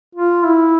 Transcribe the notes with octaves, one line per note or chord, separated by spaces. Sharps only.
F4
E4